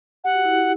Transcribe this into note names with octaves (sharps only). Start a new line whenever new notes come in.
G4 F#5
F#4
E4 G4